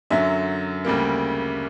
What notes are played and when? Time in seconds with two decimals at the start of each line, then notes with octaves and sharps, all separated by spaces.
0.11 F#2 D3 F#3 E5
0.85 D2 C#3 G3 A#3